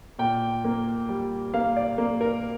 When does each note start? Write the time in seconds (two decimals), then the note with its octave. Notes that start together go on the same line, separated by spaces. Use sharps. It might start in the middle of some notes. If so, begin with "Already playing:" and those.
0.19 A#2 G5
0.65 A#3
1.09 G3
1.54 A#3 F5
1.76 D5
1.98 A#3
2.21 A#4